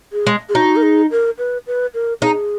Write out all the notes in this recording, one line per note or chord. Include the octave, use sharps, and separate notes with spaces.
G#4
G#3
G#4
D#4 F#4
A#4
G#4
A#4
B4
B4
A#4
D#4 G#4